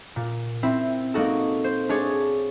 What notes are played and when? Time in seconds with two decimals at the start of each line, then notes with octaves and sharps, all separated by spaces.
0.16 A#2
0.63 C4 E4
1.14 A#3 D#4 F#4 A4
1.64 C5
1.89 D4 G#4 C#5 D5